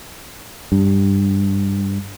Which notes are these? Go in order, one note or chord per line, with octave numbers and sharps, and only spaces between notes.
G2